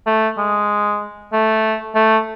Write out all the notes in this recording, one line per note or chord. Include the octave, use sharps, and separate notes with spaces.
A3
G#3
A3
A3